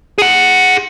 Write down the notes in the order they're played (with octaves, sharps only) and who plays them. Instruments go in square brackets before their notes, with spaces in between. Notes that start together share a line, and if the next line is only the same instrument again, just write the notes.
[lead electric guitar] G#4 F#5